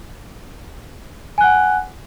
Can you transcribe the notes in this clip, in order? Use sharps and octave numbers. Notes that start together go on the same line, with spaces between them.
F#5 G#5 F#6